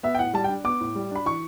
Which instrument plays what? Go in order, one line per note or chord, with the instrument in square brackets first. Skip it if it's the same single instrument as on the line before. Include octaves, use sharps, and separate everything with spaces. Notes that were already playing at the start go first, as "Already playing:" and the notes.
[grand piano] B3 E5
G5
A2 F#5
G3 A5
G5
D4
B3 D6
A2
G3
D4 B5
E3 C#6